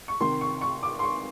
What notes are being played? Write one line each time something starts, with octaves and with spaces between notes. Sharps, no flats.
C#6
C3 D#3 C6
C#6
C#6
D6
C6
C#6